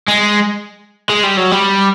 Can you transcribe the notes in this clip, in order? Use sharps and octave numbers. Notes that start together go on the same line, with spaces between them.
G#3
G#3
G3
F#3
G3